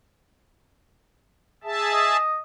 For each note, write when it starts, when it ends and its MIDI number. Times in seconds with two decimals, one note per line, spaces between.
1.64 2.17 68
1.64 2.17 76
1.64 2.17 81
1.93 2.39 75